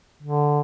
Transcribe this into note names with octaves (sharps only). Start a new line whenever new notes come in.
D3